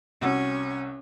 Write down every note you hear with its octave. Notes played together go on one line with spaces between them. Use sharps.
C2 C#4 F#4 E6